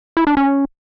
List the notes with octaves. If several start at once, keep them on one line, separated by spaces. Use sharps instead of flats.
E4
D4
C#4